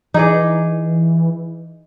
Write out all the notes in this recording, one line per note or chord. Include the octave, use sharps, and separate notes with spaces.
E3 D#4 G#4 D5